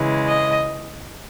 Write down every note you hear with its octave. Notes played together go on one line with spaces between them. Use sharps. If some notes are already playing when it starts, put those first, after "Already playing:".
Already playing: C#3 E3 G#3
D#5